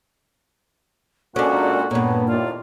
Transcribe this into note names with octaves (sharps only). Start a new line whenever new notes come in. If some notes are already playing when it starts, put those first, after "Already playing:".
A#2 G#3 C#4 D4 F#4 A4
G2 A#2 B3 C#5
D#2 A2 F4 D5